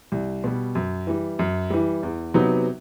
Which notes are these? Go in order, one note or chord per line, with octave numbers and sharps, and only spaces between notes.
C2
B2 G3
F#2
E3 G3
F#2
E3 G3
E2
C3 F#3 B3 D#4